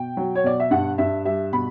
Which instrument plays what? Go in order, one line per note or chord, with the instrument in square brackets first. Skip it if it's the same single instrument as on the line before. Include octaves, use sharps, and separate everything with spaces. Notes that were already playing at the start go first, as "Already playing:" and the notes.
Already playing: [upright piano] B2 G5
F#3
C#5
B2 D5
E5
G2 F#5
G2 E5
G3 E5
B2 B5